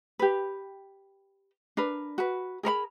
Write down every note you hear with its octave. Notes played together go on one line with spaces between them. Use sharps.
G4 B4
D4 A#4 B4
F#4 B4
G#4 A#4 B4 B5